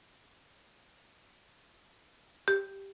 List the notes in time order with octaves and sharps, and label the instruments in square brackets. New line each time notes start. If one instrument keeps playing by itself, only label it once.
[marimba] G4